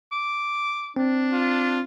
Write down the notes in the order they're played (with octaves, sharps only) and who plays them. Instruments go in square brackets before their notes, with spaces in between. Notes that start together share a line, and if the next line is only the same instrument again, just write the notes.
[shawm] D6
[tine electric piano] C4 [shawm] D4
[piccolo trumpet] F4